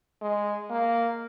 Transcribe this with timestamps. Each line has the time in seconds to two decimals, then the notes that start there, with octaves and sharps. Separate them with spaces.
0.22 G#3
0.70 A#3